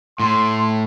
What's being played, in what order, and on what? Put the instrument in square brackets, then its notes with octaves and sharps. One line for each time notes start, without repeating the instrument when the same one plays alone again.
[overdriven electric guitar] A2 [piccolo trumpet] C6